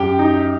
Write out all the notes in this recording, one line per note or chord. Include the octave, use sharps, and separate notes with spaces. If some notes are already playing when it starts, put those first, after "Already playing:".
Already playing: F#2 G4 G5
D#4